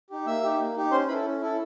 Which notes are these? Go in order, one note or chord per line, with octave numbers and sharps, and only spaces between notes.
D#4 G4
A#3 E5 E6
D#4 G4
A#3
D#4 G4
C#4 C5 C6
E4 A4 B4 B5
C#4
E4 A4